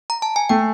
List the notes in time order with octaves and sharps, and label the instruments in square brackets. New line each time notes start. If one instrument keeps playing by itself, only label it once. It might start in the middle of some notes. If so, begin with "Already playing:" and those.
[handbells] A#5
A5
G#5
[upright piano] A3 [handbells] G5